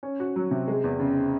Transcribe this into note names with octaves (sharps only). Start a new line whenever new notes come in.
C#4
F#4
F#3
C3
G#3
E2
C#3